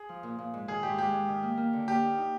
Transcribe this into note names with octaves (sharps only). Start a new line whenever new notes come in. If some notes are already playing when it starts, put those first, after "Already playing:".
Already playing: G#4
F3
A#2
A#2
G#2
D#3 G#4
G#2 G4
G#3 G4
G#2
D#3
A#3
A#3
D3
A#3 G4
D#4
D#4